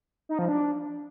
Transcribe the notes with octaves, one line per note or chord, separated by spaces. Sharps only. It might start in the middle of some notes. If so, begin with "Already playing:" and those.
D#4
F3
D4